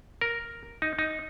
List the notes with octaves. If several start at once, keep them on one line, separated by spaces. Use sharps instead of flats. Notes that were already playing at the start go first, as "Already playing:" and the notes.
A#4
D#4
D#4